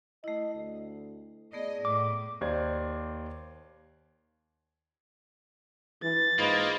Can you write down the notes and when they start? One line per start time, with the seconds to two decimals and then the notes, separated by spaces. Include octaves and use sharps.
0.24 A3 E4 D#5
0.55 D2
1.53 A3 B3 G#4 D5 D#5
1.85 A2 D6
2.41 D#2 C5 D5 G#6
6.03 E3 A6
6.39 G#2 A#3 F4 B4 D#5